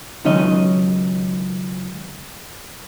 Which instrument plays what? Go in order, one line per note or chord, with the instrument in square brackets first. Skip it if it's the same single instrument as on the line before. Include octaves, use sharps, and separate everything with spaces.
[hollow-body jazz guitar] C#2 D#3 F#3 C#4 D#4 D#5